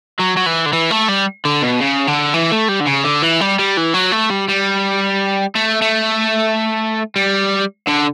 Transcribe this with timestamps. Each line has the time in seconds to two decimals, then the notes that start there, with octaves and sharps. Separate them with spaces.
0.19 F#3
0.36 F#3
0.46 E3
0.66 D3
0.73 E3
0.91 A3
1.09 G3
1.45 D3
1.62 B2
1.80 C#3
2.07 D3
2.34 E3
2.52 A3
2.69 G3
2.81 D3
2.87 C#3
3.05 D3
3.23 E3
3.41 G3
3.59 G3
3.77 E3
3.94 F#3
4.12 A3
4.30 G3
4.48 G3
5.55 A3
5.81 A3
7.16 G3
7.87 D3